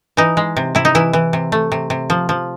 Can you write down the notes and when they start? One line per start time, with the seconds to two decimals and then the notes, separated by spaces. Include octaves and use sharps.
0.17 E3 D#4
0.37 G#3
0.56 C3
0.75 C3 E4
0.85 D#4
0.95 E3 E4
1.13 E3
1.33 C3
1.52 A3
1.72 C3
1.90 C3
2.10 F3
2.29 F3